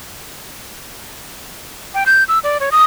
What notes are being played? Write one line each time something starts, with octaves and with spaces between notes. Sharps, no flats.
G5
G6
E6
D5
C#5
D#6